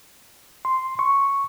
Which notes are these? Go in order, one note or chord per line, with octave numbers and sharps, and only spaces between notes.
C6
C#6